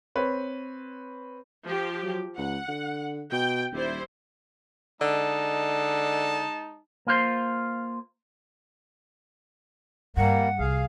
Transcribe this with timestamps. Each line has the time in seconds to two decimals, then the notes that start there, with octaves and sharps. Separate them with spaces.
0.15 C4 B4 C#5
1.65 F3 G4
2.02 F#3
2.37 C#2 F#5
2.68 D3
3.32 B2 G5
3.73 D#1 G3 E4 C5
5.01 D3 G#3 D#4 A5
7.07 A#3 F4 C5
10.17 G2 G3 A#3 F#5
10.59 C2 G#4 F5